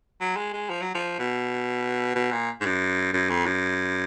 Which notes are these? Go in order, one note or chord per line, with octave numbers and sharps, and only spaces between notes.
F#3
G#3
G#3
F3
F#3
F3
B2
B2
A#2
G#2
F#2
F#2
F2
F#2